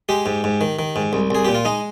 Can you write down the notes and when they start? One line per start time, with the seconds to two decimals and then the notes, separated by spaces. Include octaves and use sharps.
0.09 G#3 G4
0.26 G#2
0.44 G#2
0.61 D#3
0.79 D#3
0.96 G#2
1.13 C2
1.30 C2 G#4
1.45 A#2 G4
1.55 F4
1.65 G#3 D#4